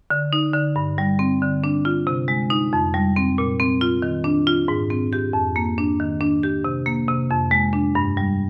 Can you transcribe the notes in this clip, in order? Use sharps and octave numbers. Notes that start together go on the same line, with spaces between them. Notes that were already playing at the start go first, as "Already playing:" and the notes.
D3
D#4
D3
G2
G3
C4
D3
D4
F4
C3
G#3
D#4
F2
G3
C4
A#2
C4
F4
D#3
D4
F4
G#2
C4
G4
F2
A#3
D4
D#3
D4
G4
C3
A#3
C3
F2
G#3
D4
G2
G3